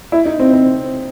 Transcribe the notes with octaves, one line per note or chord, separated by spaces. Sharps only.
E4
D#4
C4
C4